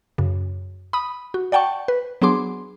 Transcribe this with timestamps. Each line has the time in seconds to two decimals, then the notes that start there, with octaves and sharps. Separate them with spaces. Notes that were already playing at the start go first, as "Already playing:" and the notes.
0.18 F#2 C#3
0.93 B5 D#6
1.34 F#4
1.52 D5 F#5 G5 A5 C#6
1.88 B4
2.22 F#3 B3 D4 G#4 C6 D6